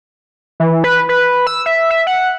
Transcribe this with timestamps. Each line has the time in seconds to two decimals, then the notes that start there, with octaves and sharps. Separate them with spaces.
0.60 E3
0.84 B4
1.09 B4
1.47 E6
1.66 E5
1.91 E5
2.07 F#5